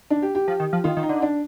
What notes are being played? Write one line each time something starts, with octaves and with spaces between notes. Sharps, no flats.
D4
G4
G4
F3
D#3
F3
D#3 F4
D#3
D#4
D3
D4